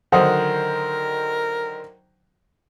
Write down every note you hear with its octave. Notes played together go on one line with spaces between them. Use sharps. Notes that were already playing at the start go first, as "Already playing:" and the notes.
D3 D#3 F#3 A#4 C5 F#5 D#6